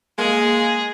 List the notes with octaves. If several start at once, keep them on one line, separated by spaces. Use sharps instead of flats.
G#3 A#3 G#4 F5